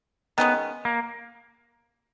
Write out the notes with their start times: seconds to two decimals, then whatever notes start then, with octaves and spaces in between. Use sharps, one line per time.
0.38 D#3 G#3 B3 C#4
0.85 A#3